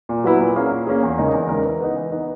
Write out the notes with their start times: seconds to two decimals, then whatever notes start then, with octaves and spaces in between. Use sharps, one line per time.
0.09 A#2
0.24 F#3 B3 E4 B4
0.40 A#2
0.56 A#3 C#4 G#4
0.71 A#2
0.87 A#3 C#4 G#4
1.02 E2
1.18 C#3 G#3 D#4 A#4
1.33 E2
1.49 C#3 G#3 D#4 A#4
1.64 E3
1.81 B3 D#4
1.96 E3
2.12 B3 D#4